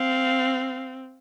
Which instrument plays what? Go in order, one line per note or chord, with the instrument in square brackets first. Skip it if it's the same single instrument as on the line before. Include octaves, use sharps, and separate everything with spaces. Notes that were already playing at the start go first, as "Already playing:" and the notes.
Already playing: [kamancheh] C4 [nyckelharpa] F5